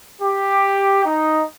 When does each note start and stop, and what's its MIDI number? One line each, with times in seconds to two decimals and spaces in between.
0.21 1.02 67
1.04 1.40 63